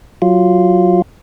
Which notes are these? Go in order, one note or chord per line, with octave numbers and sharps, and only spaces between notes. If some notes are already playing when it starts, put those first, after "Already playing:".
F#3 F4